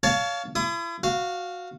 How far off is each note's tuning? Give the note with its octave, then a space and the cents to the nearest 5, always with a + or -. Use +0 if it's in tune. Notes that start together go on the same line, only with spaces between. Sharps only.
C#5 +25 F5 +0 A5 +0
E4 +40 D#6 +0
F#4 -10 F5 +0